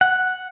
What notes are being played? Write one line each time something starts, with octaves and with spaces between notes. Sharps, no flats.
F#5